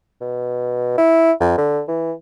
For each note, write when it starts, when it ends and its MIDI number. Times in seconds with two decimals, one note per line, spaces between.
0.21 0.93 47
0.98 1.32 64
1.40 1.54 41
1.58 1.81 50
1.88 2.13 52